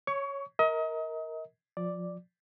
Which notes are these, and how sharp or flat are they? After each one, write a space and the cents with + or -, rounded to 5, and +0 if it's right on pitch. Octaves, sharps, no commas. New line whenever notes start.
C#5 +0 C#6 +25
A#4 +0 D#5 +35
F3 +25 D5 +0